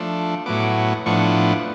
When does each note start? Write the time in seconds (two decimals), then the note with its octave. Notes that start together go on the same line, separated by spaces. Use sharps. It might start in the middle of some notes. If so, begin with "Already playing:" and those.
Already playing: F3 A3 D4
0.46 A2 F#3 B3 D6
1.06 A2 F3 B3 D4 C#6